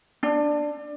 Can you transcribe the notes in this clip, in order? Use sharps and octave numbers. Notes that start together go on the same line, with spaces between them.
D4